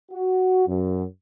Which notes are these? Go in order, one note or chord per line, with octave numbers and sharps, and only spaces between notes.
F#4
F#2